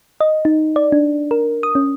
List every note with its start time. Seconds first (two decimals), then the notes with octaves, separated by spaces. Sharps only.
0.20 D#5
0.45 D#4
0.76 D5
0.92 D4
1.31 A#4
1.63 D#6
1.75 C#4